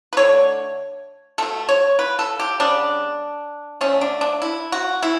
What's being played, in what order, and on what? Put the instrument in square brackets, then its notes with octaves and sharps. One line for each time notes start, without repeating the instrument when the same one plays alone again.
[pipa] B4
D3 A3 C#5
B2 A3 A4
C#5
B4
A4
G4
C#3 G3 B3 D4
D3 A3 C#4
D4
D4
E4
F#4
E3 B3 E4